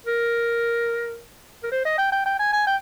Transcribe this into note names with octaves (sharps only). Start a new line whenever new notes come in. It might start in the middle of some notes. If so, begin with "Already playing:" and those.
A#4
A#4
C5
D#5
G5
G5
G5
G#5
G#5
G5